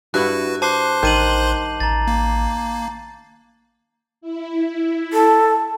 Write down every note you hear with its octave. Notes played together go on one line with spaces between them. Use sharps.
G2 E4 F#4 B4 F#5 F#6
C5 A5 C6 D6 F#6 C7
A1 D#3 G6 D#7 F#7
A1 A#5 A6
A#3
E4
A4